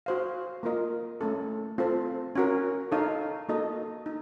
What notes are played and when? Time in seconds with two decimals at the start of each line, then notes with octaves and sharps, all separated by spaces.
0.06 F#4 C5 F5
0.63 A#3 F4 A#4 D#5
1.21 A3 C#4 A4
1.78 C4 F4 A4 C5
2.35 C#4 F#4 A#4
2.92 D#4 A4 C#5 F5
3.49 A#3 D#4 F#4 A4 D#5
4.06 D#4